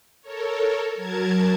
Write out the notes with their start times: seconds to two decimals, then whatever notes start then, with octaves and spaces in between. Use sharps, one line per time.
0.22 A4 A#4 C#5
0.95 F#3 A#4 A5 G#6